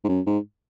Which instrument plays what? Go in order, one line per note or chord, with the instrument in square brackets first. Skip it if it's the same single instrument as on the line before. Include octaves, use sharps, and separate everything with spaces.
[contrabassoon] G#2
F#2
G#2